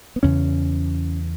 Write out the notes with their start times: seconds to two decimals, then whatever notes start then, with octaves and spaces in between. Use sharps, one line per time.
0.16 B3
0.23 E2 C#3 C#4